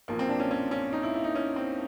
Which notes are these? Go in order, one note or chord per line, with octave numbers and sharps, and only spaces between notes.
B1 A#2 F3 A#3
C4
D4
C#4
C#4
C#4
D#4
E4
E4
D#4
C#4
C4